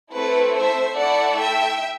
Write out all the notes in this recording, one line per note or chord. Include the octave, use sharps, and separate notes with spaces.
A3 C4 E4 A4 B4
C5 E5
A3 E4 A4 D5 F#5
E5 G5